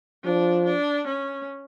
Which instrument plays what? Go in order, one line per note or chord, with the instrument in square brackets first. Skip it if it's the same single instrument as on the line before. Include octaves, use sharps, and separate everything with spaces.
[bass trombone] F3 [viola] D4
[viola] D4
C#4